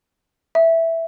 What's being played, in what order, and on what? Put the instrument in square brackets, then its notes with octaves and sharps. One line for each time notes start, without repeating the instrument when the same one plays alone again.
[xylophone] E5